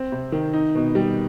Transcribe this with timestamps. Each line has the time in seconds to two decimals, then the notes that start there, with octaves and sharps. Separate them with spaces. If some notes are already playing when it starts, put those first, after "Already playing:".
Already playing: C4
0.12 C3
0.32 D#3
0.53 D#4
0.75 B2
0.95 G3